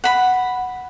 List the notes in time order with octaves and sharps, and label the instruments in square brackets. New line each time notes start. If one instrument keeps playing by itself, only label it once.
[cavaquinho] F#5 B5